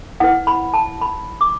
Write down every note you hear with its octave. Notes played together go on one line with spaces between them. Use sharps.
E4 B4 F#5
B5
A5
B5
D6